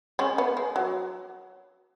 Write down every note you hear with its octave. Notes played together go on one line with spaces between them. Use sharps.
G#3 C#4
B3
G#3
F#3